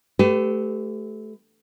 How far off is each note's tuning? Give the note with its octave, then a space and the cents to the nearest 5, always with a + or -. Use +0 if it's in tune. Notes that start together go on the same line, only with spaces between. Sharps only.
A3 -20 G4 -15 B4 +35